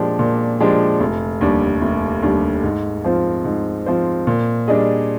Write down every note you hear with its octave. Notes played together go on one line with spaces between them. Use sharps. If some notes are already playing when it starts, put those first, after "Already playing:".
Already playing: A#2 F3 G#3 D4 G4
A#2
F3 G#3 D4 G4
F1
D#2 D3 G3
F1
D#2 D3 G3
G#2
F3 C4 F4 C5
G#2
F3 C4 F4 C5
A#2
G3 D4 G#4 D#5